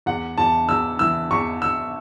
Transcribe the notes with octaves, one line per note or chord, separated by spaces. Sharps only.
E2 F#5
E2 A5
E2 E6
E3 E6
E2 C#6
E2 E6